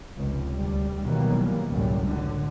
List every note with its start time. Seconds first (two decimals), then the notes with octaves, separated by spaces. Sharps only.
0.16 F1 C#2
0.52 D2 G3
1.02 B2 D#3 E3 F#3 G3 A#3
1.67 C#2 F#2 A2 G3
2.07 D3